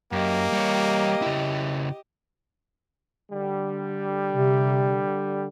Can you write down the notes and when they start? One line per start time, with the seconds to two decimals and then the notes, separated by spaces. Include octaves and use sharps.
0.12 F#2 A#3 G4 D#5
0.53 G3 C#5
1.22 C#3 E4
3.30 D3 G3
4.32 C3